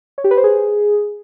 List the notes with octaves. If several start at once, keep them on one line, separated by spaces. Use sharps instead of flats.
C#5
G4
B4
C5
G#4